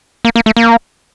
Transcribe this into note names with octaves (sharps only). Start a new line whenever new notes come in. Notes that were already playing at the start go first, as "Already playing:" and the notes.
A#3
A#3
A3
A#3